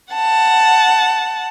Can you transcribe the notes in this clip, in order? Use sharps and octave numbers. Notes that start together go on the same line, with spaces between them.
F#5 A5